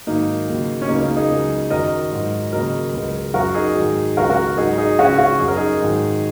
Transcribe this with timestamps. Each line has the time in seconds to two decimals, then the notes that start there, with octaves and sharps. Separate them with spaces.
0.07 G#2 D#3 F#3 A#3 D#4
0.48 D#2 C#3 F#3
0.82 C#4
0.88 C#2 C#3 F#3 A#3 D#4
1.02 A#3 D#4
1.16 D#4 G#4
1.29 C#2 C#3 F#3
1.70 F#2 D#3 F#3 A#4 D#5
2.11 G#2 F#3
2.52 D#2 C#3 F#3 A#4 D#5
2.93 C#2 C#3 F#3
3.34 F#2 F#3 F#4 A#4
3.54 D#4 G#4
3.75 G#2 D#3 F#3
4.17 C#2 C#3 F#3 F#4 A#4
4.30 F#4 A#4
4.58 G#2 F#3 D#4 G#4
4.78 D#4 G#4
4.98 C#2 C#3 F#3 C#4 F#4
5.18 C#4 F#4
5.39 F#2 F#3 G#4
5.48 A#4
5.57 D#4 G#4
5.80 G#2 D#3 F#3